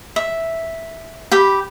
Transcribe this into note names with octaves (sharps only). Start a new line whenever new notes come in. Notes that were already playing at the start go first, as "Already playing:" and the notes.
E5
G4 G5 B5